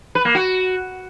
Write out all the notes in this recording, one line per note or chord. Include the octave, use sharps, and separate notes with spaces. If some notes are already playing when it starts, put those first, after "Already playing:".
B4
A#3
F#4